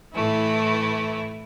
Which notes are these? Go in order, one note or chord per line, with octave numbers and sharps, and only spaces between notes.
A2 E3 A3 E4